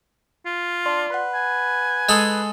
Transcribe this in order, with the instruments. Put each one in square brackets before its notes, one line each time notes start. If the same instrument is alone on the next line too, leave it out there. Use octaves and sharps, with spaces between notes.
[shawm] F4
[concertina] D4 [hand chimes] D5 C6
[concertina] B4 [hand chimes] F#5 B5
[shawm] G#5
[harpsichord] G#3 G#4 A4